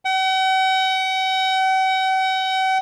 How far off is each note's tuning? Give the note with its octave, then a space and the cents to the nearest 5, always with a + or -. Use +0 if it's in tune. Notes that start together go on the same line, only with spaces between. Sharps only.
F#5 +45